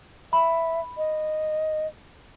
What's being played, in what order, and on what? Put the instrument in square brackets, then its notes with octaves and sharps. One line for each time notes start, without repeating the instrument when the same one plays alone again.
[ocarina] E5 [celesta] B5
[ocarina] D#5